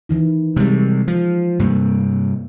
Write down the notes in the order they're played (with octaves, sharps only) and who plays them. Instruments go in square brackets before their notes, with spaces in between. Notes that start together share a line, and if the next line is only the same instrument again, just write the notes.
[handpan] D#3 E3 E4
[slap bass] C3 G3 [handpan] G#3
[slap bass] F3
[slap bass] G2 C3 [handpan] A#3